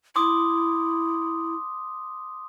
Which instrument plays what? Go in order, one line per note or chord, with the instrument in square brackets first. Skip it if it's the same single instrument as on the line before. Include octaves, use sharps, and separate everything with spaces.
[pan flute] E4 [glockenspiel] C6 D6 D#6